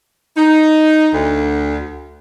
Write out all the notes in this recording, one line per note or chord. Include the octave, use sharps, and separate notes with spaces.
D#4
D2